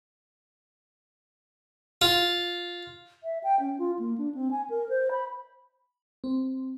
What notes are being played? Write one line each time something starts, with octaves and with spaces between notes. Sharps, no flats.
F4
E5
G5
C#4
F4
A#3
D4
C4
G#5
A#4
C5
B5
C4